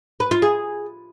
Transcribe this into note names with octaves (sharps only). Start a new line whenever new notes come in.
B4
F4
G#4